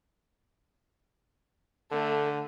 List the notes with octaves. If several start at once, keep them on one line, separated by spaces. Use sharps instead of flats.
D3 A3